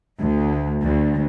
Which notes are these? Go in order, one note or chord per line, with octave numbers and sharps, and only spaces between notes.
D2
D2